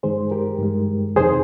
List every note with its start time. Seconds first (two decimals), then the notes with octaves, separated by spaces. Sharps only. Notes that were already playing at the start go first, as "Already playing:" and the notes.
0.03 G2 D#3 G#3 G#4 C5
0.31 G4 A#4
0.59 G2 D#3 G#3
1.16 F2 C3 D#3 G#4 C5